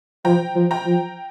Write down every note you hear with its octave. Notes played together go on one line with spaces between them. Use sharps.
F3 G5 A#5
F3
G5 A#5
F3